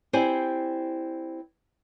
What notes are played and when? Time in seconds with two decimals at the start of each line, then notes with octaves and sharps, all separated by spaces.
0.13 C4 E4 G4 C5 D5 G#5